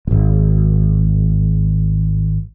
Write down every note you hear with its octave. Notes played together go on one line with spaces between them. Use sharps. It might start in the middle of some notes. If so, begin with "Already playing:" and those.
D#1 G#1